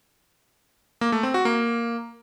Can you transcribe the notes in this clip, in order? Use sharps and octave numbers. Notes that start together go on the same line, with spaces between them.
A#3
A3
C4
F#4
A#3